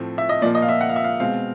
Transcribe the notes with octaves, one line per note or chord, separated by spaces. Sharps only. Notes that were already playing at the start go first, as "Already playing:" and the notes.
Already playing: A2 F3 A3 C4
E5
D#5
A#2 F3 A#3 D5
D#5
F5
E5
F#5
F5
E5
F5
B2 G#3 C4 F5